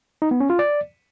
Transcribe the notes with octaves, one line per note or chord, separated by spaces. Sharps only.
D#4
B3
C#4
F4
D5